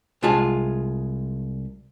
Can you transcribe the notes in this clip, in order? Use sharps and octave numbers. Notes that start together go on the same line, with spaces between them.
C2 G#3 F4 G#4 A5